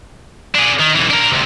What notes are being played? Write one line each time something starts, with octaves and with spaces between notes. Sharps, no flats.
D4 G#4
D#3
B1 E3
D4 A#4
D2 C3